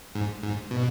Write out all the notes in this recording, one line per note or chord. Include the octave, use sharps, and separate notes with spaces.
G#2
G#2
B2